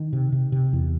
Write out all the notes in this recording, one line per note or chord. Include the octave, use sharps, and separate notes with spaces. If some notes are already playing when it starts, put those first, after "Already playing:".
Already playing: D#3
C3
C3
C3
E2